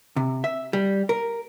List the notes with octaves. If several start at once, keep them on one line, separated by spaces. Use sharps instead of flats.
C3
E5
G3
A#4